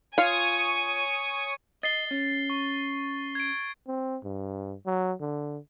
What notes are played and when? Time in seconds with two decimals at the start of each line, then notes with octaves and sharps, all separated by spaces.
0.18 F4 C#5 F5 G#5 C#6 D#6
1.83 D#5 A6 C7 G7
2.11 C#4
2.50 C#6
3.35 G#6 D7
3.88 C4
4.24 G2
4.86 F#3
5.21 D3